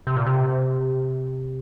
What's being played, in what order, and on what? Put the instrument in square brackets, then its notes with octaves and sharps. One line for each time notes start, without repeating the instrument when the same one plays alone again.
[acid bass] C3
A#2
C3